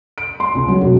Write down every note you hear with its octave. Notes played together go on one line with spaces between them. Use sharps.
D7
C6
C#2
F#3
E1